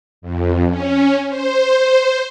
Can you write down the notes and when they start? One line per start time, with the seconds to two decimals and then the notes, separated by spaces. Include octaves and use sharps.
0.22 F2
0.69 C#4
1.28 C5